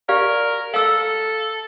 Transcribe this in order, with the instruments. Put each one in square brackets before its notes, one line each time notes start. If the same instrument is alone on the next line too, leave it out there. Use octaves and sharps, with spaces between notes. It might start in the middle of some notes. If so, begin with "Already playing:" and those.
[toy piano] G4 D5 F5 [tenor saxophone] A#4
[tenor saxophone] A4 [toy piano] F5 E6